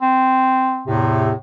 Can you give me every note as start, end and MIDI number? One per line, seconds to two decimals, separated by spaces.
0.02 0.86 60
0.87 1.32 40
0.87 1.32 45
0.87 1.32 48